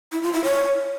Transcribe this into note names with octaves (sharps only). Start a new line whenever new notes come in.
E4
F4
E4
C#5